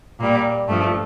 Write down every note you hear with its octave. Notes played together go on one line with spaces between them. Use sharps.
A#2 G3 A#3
G2 F3 A3